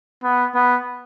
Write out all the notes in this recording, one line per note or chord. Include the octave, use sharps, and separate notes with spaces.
B3
B3